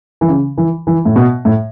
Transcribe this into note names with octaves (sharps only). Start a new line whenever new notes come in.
E3
C#3
E3
E3
A2
B2
A2